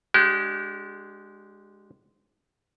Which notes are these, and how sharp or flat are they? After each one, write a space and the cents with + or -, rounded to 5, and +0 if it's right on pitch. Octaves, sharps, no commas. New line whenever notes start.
G#3 +0 D4 +0 G4 -40